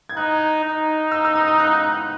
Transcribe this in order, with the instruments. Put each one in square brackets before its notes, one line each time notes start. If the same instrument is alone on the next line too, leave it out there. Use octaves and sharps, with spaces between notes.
[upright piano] G#6
[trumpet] D#4 [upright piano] F#6
[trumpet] D#4
[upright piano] E6
E6
D#6
D#6
F#6
F#6